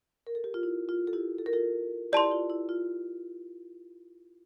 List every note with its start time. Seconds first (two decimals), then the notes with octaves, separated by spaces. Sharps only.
0.27 A#4
0.35 A4
0.44 G4
0.54 F4
0.63 E4
0.89 F4
1.07 A4
1.13 E4 G4
1.38 A4
1.46 A#4
1.53 F4 A4
2.12 E4 G4 D5 A5 C6
2.32 F4
2.50 E4
2.69 F4